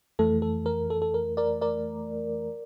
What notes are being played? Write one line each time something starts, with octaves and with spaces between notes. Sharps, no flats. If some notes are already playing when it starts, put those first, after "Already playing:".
F2 E3 A3 A4
A4
A#4
A4
A4
A#4
A#4 D5
A#4 D5